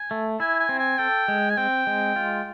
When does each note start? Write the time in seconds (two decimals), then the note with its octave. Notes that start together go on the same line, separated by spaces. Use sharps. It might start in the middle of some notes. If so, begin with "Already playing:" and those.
Already playing: G#5
0.11 A3
0.40 E4 G#5
0.60 G#5
0.69 C4
0.79 G#5
0.98 A4 G5
1.28 G#3
1.50 G#5
1.57 C4 G5
1.87 G#3
2.16 F4